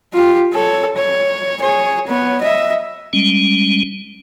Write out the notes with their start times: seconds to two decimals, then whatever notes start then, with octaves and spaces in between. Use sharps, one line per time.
0.13 F4 G4
0.52 A4 C#5
0.96 C#5
1.61 G#4 C#5
2.07 B3 C#5
2.41 D#5 E5
3.13 G3 G#3 C#4